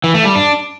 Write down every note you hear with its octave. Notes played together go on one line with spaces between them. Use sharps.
E3
A3
G3
D4